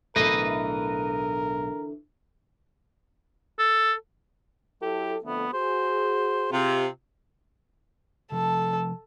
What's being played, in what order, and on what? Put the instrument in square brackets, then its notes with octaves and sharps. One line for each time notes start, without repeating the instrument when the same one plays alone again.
[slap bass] B1 A2 [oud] D3 E3 A3 [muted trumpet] A#4 [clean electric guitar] B4 D#5
[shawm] A4
[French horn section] F#3 E4 A4 [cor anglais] G4
[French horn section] F2 D3 A3 [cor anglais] B3
[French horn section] F#4 G#4 [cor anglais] C5
[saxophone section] C3 [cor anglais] F4
[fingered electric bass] C3 F3 [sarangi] A4